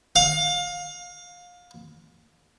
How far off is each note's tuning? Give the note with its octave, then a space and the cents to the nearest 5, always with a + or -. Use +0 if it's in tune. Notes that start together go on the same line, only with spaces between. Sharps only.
F5 +25